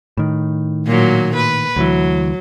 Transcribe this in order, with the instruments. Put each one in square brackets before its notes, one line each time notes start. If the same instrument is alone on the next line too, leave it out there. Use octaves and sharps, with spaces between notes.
[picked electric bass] A2 D#3
[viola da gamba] A#2 F#3
B4
[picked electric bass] D2 E3 [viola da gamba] F#3